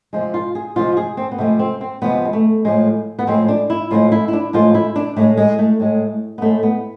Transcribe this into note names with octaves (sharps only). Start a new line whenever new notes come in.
C3 F3 G#3
F4
G#4
C3 F3 G#3 F4
G#4
C4
B3
C3 F3 G#3 A3
C4
C4
C3 F3 G#3 B3
G#3
A3
A2 F3 G#3
B3
A2 F3 G#3 C4
D4
E4
A2 F3 G#3 F4
E4
E4
D4
A2 F3 G#3 F4
E4
D4
A2 G#3 A3
G#3
A3
A2 G#3
B3
A2 G#3 A3
B3